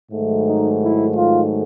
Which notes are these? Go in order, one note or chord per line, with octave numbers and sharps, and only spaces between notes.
G#2 D#3 F#3 A3
D#4
E4
F4